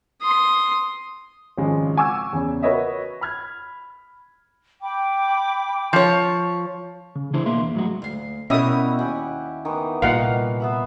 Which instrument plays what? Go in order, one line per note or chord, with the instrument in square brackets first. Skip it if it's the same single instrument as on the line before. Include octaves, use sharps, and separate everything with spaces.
[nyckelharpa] C6 D#6
[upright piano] G#1 C#3 F3 G#3
F#5 G#5 C#6 D6 E6 G#6
E2 C#3
F#4 A#4 B4 C#5 D#5 E5
B5 F6 G#6
[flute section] G5 B5 D6
[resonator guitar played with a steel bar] F3 C#5
[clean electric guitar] C#3
D2 E3 D4 E4 G#4 C5
B2 A#3 E5 C6
E2
A2 F#3 G#3 F#4
[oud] D2 F5
[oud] B2 A#4 [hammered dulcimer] G3 E4 F#4 [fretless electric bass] C#4 [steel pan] E5 D#6
[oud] D#2 [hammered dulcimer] G4 F#5 G#5
[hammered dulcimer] D#3 E3 B3
[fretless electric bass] C2 A#2 G3 [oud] D#4 G4 B4 [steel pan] F5 F#5
[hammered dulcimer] B3 E5 B5